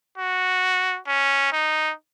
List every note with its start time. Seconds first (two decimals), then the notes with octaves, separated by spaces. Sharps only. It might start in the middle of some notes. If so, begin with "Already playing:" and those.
0.18 F#4
1.08 C#4
1.52 D#4